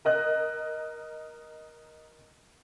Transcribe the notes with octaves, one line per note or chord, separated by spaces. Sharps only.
A#4 D#5 F#6